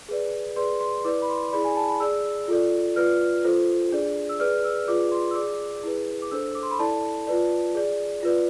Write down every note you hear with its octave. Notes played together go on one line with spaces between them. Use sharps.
G#4 B4 D5
G#4 B4 D5 C6
C6
E4 B4 D5 D6
B5
C6
E4 G#4 D5 B5
G#5
A5
B5
G#4 D5 E6
F4 A4 D5
F4 B4 D5 F6
F4 A4 C5
D4 G#4 D5
E6
G#4 B4 D5 F6
E6
F4 G#4 B4 D5 D6
C6
E6
G#4 D5 D6
E4 G#4 B4
D6
D4 A4 C5 E6
D6
C6
B5
E4 A4 D5 A5
F4 B4 D5
G#4 D5
F4 B4 D5